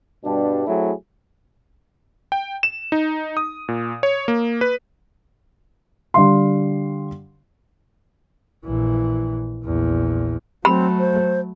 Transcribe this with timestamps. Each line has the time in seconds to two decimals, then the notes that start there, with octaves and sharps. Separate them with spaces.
0.24 G2 B2 G3 D4
0.67 F#3 A3 C4 E4 G#4
2.32 G5
2.63 E7
2.92 D#4
3.37 D#6
3.68 A#2
4.03 C#5
4.28 A#3
4.61 B4
6.14 D3 G3 F5 C6
8.64 A#1 E3
9.64 A#1 E2
10.65 F#3 A3 C4 B5
10.99 C5